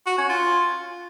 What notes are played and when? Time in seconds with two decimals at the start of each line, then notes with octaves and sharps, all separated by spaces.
0.06 F#4
0.18 C#4
0.29 F4